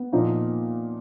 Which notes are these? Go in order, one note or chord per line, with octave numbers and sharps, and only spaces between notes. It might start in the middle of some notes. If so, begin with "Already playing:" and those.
Already playing: B3
A#2 F3 A#3 D#4